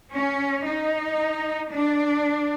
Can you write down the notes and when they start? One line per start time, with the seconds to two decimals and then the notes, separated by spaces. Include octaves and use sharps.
0.12 C#4
0.65 D#4
1.72 D4